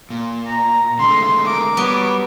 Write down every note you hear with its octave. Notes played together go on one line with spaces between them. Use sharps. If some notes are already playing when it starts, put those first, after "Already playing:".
A#2
A#5
D3 G#3 A3 C6
A#4 D6
F#3 G3 B3